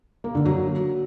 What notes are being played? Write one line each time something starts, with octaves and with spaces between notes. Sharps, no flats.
A#3
D3
F#3